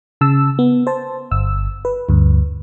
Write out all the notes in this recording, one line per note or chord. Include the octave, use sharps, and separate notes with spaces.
C#3 A5 E6
B3
C5 A5
G1 E6
B4
D2 G2